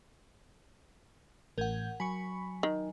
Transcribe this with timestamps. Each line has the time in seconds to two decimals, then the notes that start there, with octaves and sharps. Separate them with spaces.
1.58 A1 A#4 F#5 G6 G#6
2.00 F#3 G#5 B5 C#6
2.63 D#3